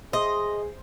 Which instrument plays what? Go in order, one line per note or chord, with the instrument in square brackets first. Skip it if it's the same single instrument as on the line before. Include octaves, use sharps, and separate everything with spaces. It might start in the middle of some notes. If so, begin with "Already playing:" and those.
[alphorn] G#4 [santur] C5 [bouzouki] D#5